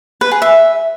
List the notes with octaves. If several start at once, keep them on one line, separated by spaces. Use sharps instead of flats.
B4
G#4
E5